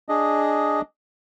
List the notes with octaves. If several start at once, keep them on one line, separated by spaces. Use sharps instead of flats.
D4 G#4 D#5